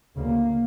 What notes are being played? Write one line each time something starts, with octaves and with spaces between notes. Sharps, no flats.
D2 C#3 A#3